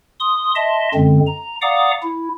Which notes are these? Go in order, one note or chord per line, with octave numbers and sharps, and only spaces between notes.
C6 D#6
D#5 E5 A5 C6
F#2 D3 G#3 C4
A#5
D5 F5 F#5 A#5 D6 D#6
E4